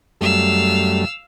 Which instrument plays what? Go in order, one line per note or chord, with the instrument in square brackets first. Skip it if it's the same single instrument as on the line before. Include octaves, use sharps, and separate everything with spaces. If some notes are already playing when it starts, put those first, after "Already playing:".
[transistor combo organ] F#2 G3 A3 [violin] F5 E6